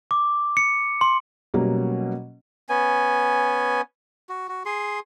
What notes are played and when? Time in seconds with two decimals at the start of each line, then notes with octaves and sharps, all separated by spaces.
0.11 D6
0.57 C#7
1.01 C6
1.54 B2 F#3 G3 A#3 C#4
2.69 B3 C#4 G#5
4.29 F#4
4.48 F#4
4.65 G#4 C6